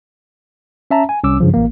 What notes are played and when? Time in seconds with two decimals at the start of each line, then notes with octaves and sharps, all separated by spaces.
0.91 C#4 E5 A5 A#5
1.09 G#5
1.24 C2 C#4 D6 E6
1.40 G2 C#3 F3
1.54 A1 A#3